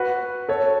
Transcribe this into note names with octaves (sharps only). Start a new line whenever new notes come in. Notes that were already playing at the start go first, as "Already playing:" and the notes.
Already playing: F#4 B4
A4 C#5